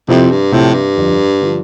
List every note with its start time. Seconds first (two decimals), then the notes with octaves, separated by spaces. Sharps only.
0.08 F2 C3 F3 C4 E4 G4
0.31 G2
0.52 A2 C3 F3 C4 E4 G4
0.74 G2
0.96 F2 D3 F3
1.42 D3 F3